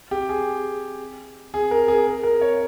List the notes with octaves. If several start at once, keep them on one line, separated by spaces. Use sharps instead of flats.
G4
G#4
G#4
A#4
G#4
A#4
A#4
C#5